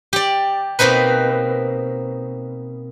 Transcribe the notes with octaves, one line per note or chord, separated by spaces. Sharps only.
G4 D5
B2 A#3 C4 D#4 B4